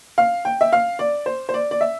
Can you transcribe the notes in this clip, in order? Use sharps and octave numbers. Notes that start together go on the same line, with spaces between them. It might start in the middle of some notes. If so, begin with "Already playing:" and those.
F5
G5
E5
F5
D5
C5
C5
D5
D5
E5